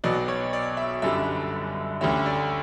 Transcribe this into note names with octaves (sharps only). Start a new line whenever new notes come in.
B1 B2 F#3 B3 D5
C#5
D5
E5
G1 F#2 D3 G3 E5
D2 D3 G3 C#4 E5
D5